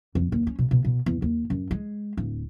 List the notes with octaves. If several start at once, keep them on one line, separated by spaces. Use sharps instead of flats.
F2
D#2
C#4
B2
B2
B2
E2
D#2
F#2
G#3
D1